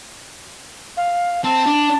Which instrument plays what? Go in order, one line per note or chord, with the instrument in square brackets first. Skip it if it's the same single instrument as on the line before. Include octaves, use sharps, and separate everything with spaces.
[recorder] F5
[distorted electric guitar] C4 [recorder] A5
[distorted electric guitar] D4